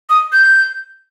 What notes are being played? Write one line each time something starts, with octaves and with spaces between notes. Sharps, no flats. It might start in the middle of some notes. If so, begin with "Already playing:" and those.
D#6
G6